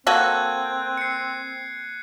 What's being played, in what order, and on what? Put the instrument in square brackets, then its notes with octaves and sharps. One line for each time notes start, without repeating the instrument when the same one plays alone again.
[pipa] A#3 F#4 A4 [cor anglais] C4 [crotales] F#6 G#6 D#7
[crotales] C7 C#7